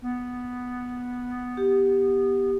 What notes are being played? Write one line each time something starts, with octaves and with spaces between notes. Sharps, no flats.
B3
G4